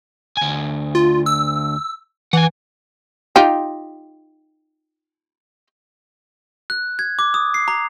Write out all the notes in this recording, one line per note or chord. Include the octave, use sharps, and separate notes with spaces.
D2 G#5
F4
E6
E3 F#5 G#5
D#4 F4 G4
F#6
G#6
D6
D#6
C7
A#5